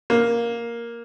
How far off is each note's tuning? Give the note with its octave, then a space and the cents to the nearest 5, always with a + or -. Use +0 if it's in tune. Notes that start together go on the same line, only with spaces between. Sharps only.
A#3 +5